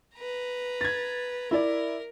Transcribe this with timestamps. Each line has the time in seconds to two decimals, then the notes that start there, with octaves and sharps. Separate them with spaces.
0.15 B4 A#5
0.81 G#6 A6
1.51 E4 A#4 D5